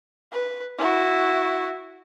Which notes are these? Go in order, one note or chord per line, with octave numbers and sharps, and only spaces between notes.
B4
E4 F#4